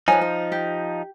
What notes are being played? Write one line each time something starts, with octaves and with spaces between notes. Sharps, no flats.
F3 D#4 B4 C#5 G#5
C5
G4